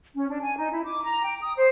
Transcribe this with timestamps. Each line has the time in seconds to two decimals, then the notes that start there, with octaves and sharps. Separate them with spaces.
0.15 C#4
0.30 D4
0.42 G#5
0.57 D#4
0.71 E4
0.85 D6
1.04 A#5
1.23 G5
1.41 D#6
1.57 C5